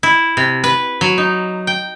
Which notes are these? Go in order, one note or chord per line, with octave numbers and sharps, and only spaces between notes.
E4
C3
B4
F#3
D#4
G5